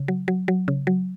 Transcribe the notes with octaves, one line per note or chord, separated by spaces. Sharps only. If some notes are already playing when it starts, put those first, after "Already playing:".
Already playing: C#3
F#3
F#3
F#3
C#3
F#3